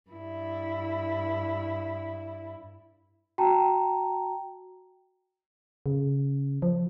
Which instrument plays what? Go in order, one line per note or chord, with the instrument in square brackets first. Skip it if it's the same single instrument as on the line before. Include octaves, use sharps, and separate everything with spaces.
[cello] G2 E4
[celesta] F#4 G5 A5 A#5
[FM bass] C#3
F3